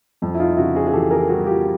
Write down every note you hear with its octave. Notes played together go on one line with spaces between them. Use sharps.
F2
E4
D#4 F4
C#3 E4 F#4
F#4 G#4
G#4
E3 G4 A4
G#4 A#4
G3 F#4 G#4
F4 G4